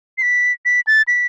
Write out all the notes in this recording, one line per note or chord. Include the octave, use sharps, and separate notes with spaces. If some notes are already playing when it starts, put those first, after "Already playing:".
C7
B6
B6
A6
B6